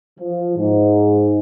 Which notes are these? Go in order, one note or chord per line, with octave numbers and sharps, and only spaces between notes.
F3
G#2